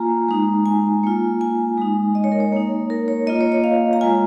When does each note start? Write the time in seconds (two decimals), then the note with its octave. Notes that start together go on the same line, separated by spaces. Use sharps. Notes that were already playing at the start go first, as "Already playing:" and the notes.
Already playing: A#3 F4 G#5 A#5
0.29 G#3 D#4
0.66 G#5
1.03 A#3 F4
1.41 G#5
1.78 G#3 D#4
2.15 D#5
2.24 C#5
2.32 A#4
2.40 C#5
2.52 A#3 D#4
2.90 A#4
3.08 C#5
3.27 A#3 F4 D#5
3.41 C#5
3.52 D#5
3.64 F5
3.93 A#5
4.01 G#3 F4 G#5